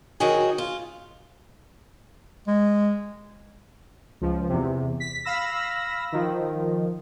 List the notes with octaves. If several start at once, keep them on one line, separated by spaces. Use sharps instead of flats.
D#3 F#3 F#4 G#4
F4
G#3
C#2 F3
E2 C3
B6
F5 B5 E6 A#6
D#3 F3